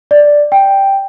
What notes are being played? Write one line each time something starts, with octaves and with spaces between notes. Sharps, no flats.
D5
G5